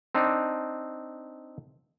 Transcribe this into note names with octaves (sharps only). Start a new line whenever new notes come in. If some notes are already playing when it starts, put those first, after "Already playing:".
C4 D4 D#4